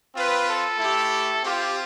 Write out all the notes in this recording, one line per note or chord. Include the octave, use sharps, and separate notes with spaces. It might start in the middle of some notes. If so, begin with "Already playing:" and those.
C4 F4 B4
A4
A3 E4 G4
C4 F4 G4